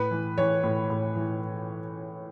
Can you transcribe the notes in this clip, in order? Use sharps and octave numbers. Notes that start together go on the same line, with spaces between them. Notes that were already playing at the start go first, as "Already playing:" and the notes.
Already playing: A2 B4
E3
E3 C#5
A2
A2
E3